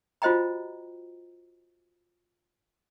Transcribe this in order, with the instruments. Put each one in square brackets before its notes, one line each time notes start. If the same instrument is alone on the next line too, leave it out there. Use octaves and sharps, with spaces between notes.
[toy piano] F4 F#4 C5 D#5 G5 A#5